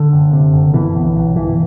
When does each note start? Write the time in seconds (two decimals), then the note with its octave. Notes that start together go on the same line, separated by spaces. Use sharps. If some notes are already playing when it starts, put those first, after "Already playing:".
Already playing: D3
0.13 F#1
0.33 C3
0.54 F#1
0.74 B2 E3
0.95 B1
1.16 B1
1.36 G1 E3